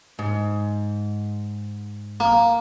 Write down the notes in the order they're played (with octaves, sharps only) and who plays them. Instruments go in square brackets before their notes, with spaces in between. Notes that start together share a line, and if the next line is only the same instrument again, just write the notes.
[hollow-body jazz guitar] G#2
[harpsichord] A#3